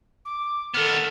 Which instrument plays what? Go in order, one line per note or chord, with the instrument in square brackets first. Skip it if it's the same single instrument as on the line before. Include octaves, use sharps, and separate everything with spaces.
[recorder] D6
[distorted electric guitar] D#3 B3 [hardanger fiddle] A4 [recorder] F6